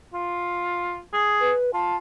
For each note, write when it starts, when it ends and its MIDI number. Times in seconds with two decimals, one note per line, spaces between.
0.14 0.98 65
1.13 1.51 68
1.41 1.71 71
1.74 1.97 65
1.74 1.96 81